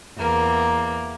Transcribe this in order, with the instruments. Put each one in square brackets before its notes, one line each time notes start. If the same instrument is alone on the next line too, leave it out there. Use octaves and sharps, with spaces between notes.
[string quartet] E2 A#3